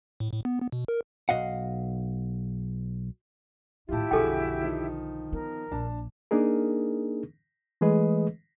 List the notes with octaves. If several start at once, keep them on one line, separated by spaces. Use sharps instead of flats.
A2
A2
B3
B3
B2
A#4
B1 A#2 D#5 F5 F#5
D#2 A2 E4 F4 G4 E5 A5
B1 F2 D3 F#4 G#4 A4 G5 G#5
D#3 F3 D#4
B3 A#4
A#1 A#3 D4 A5
A#3 D4 D#4 G#4 A#4
E3 G#3 A3 G#4 B4 D#5